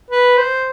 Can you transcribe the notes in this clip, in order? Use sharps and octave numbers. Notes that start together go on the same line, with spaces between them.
B4
C5